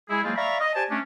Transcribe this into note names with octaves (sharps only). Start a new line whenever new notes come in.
G#3 E4 G#4
F#3 G#3 A#3 C4 F4 G#4
D5 E5 F5 A#5 B5 C#6
D#5
G4 C5 D5 G#5 A5
A3 C#4 D4